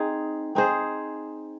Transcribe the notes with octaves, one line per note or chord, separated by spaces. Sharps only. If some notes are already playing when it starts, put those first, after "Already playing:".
Already playing: C4 D#4 G#4
C4 D#4 G#4 C5